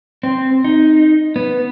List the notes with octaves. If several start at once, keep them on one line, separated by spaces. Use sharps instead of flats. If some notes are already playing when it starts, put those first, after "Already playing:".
C4
D#4
B3